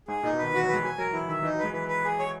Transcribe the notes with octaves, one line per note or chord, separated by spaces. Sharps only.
G#2 G#4
A#2 D#4
B2
D#3 B4
E3 F#4
F#3
B4
G#3
F#3 G#5
F#3 A#4
E3 E4
D#3 E5
E3 D#4
F#3
G#3 B4
E3 B4
B4
G#4
C#5